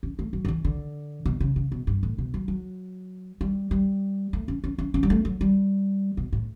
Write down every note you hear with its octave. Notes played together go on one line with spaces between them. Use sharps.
C#4
A3
F#3
D3
E3
D3
B2
C#3
C#3
B2
G2
A2
B2
F#3
F#3
G3
G3
A3
C#4
C#4
C#4
C#4
G3
A3
F#3
G3
B2
A2